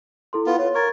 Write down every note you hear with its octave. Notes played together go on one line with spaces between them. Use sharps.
E4 A4 C6
B3 F4
F4 C#5
A#4 C#6 G#6 A6